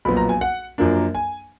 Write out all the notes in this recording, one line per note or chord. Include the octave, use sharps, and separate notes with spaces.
B1 A#2 F3 B3 B5
A#5
G#5
F#5
F#2 F3 A#3 D4
G#5